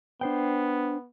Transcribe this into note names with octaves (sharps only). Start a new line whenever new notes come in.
B3 D4 C5 G5